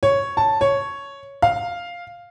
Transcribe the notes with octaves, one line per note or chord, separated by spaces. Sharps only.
C#5
A5
C#5
F5